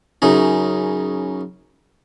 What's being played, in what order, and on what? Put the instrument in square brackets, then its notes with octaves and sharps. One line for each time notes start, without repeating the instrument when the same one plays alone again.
[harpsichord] F#2 C#3 D#4